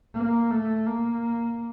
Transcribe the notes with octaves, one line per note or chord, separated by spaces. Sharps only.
A#3
A3
A#3